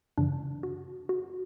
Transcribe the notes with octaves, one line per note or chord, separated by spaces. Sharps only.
F#2 C#3 E3 D4
F#4
F#4